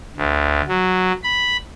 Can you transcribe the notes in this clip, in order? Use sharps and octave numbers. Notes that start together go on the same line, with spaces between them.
D2
F#3
B5